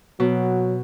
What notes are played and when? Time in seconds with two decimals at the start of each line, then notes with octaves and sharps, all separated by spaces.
0.20 B2 F#3